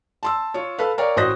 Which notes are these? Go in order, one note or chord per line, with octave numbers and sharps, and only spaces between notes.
A5 C6 E6
F4 C#5
A4 B4 F5
A#4 C#5 D5 F5 G5
A1 F#4 C5 D#6 F#6 A#6